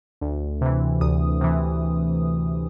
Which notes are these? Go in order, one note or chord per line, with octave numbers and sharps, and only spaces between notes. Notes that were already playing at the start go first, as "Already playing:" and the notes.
D2
C3 E3
D2 D#6
C3 E3